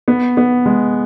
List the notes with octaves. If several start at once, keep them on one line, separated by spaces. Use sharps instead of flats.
B3
B3
G#3